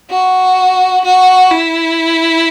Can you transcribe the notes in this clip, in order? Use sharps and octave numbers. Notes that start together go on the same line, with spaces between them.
F#4
F#4
E4